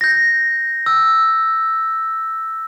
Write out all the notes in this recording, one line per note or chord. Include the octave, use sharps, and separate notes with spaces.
G6 A#6
E6